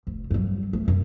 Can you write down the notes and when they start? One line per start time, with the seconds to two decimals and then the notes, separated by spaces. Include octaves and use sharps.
0.07 F1
0.31 G2 F#3
0.73 A3
0.88 F#2